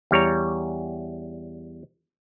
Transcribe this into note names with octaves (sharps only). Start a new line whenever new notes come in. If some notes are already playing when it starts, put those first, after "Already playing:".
E2 G3 C#5 A#5